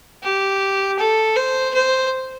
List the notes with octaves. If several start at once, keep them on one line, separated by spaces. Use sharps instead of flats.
G4
A4
C5
C5